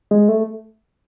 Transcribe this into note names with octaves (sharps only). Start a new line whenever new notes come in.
G#3
A3